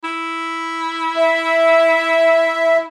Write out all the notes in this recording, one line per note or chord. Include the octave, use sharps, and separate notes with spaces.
E4
E5